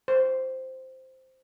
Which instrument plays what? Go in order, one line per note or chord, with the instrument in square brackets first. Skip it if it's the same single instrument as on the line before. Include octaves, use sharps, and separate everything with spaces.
[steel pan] C5